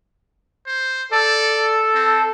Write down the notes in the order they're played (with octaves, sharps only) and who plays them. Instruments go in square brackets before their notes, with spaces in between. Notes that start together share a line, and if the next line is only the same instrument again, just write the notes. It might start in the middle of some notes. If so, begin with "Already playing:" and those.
[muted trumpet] C5
[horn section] A4 [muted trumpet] D5
[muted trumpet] C4